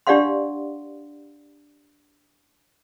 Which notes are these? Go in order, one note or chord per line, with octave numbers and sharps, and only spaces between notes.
D4 G4 D5 F5 F#5 C6